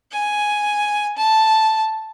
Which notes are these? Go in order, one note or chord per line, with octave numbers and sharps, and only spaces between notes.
G#5
A5